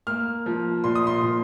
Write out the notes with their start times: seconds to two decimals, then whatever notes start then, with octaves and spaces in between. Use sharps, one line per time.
0.07 A#3 F6
0.46 F3
0.84 A#2 C6
0.95 D#6
1.07 C6
1.22 A#2